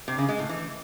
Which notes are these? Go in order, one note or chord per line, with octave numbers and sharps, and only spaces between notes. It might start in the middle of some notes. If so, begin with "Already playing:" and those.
C3
C#3
G#3
A2
E3